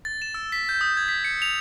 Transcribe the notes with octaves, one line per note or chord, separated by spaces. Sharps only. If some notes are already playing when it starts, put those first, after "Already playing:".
A6
E7
E6
B6
G6
D#6
G#6
B6
C#7
F7